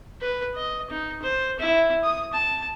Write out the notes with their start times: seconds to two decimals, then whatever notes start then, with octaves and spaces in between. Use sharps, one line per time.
0.21 B4
0.55 D#5
0.90 D#4
1.22 C5
1.59 E4
2.03 D#6
2.33 A5